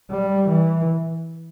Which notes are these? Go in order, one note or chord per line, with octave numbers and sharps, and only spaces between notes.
G3
E3